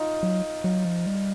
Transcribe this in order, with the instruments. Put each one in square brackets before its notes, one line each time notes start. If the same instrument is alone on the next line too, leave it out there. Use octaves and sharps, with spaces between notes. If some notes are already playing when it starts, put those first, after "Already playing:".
Already playing: [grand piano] D#4 F4
[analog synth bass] F#3
F#3
F3
G3